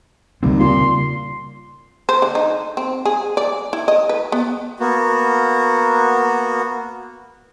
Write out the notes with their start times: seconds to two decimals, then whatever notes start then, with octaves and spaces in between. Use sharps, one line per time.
0.43 D#2 C#3 G3 C4
0.60 A#2 C6
2.09 C5
2.22 D3
2.35 D#4
2.77 C4
3.05 G#4
3.37 D5
3.73 E4
3.88 D#5
4.09 B4
4.32 B3
4.80 A#3 B3 F#4